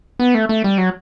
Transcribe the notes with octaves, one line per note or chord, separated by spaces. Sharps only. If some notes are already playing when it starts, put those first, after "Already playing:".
B3
A3
A3
G3
F#3